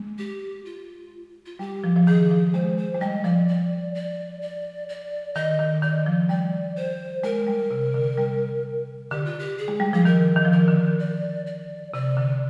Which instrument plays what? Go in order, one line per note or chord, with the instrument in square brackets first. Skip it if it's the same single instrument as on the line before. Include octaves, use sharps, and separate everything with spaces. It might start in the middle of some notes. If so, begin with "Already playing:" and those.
Already playing: [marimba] G#3
[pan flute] G4
F4
F4
[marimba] G3 [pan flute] G4
[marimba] F3
F3
[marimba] D#3 [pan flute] G#4
[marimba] F3
[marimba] G#3 [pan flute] C5
[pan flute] C5
[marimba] G#3
[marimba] G3 [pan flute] D#5
[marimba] F3 [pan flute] D5
[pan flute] D5
D5
D5
D5
[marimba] D#3 [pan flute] D#5
[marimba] D#3
[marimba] D#3 [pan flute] D5
[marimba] F3
[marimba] G3 [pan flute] D5
[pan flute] C5
[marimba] G#3 [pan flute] A#4
[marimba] G3
C3
D3
G3
[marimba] D3 [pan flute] G4
[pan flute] F4
G4
G#4
[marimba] G#3
G3
[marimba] F3 [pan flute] G#4
[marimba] D#3 [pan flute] A#4
[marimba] D#3
F3
[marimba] D#3 [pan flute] A#4
[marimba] D3
[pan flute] D5
D5
[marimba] C3 [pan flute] D5
[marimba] D3